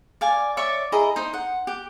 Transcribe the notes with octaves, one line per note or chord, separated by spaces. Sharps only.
D5 F5 G#5
C#5 D5 E5 C#6
E4 G#4 D#5 A#5
D#4 C5
F#5
G4